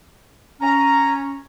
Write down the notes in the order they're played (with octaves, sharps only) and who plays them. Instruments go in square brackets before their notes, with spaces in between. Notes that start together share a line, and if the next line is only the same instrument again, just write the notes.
[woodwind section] C#4 [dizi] A#5